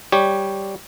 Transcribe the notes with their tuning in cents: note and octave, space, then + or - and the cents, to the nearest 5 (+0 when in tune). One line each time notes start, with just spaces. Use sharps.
G3 +0 G4 +0 C#5 +0